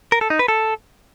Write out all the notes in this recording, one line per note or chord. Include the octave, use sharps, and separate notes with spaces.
A#4
A4
D#4
B4
A4